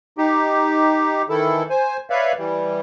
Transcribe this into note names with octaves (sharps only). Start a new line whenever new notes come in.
D#4 G4
D#3 E3 E4 A4
C5 G#5
B4 C#5 D5 E5 F5
E3 G3